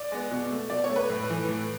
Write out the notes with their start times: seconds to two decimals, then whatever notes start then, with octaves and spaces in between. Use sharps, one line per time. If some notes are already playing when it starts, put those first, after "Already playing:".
Already playing: D5
0.12 G#3 B3
0.31 B2
0.51 A3
0.70 B2 D5
0.84 C#5
0.89 A3
0.96 B4
1.10 A2
1.30 E3 A3
1.49 A2